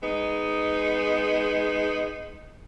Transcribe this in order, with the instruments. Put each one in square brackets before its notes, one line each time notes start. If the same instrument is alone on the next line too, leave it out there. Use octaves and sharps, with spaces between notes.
[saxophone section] G#3 B3 D#4